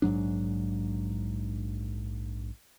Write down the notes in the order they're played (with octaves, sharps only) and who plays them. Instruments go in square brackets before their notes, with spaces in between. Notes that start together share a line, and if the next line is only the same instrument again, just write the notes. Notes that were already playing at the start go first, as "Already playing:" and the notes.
[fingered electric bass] A#1 G#2 F#3 D4